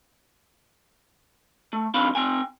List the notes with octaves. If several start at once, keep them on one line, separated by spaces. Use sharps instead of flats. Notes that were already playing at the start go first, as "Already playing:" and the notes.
A3
F2 D#3 C4 D4 F5 B5
C3 F#3 C4 G5 G#5